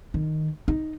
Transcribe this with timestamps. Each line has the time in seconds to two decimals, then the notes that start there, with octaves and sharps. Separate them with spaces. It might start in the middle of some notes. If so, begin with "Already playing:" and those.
0.14 D#3
0.68 D#4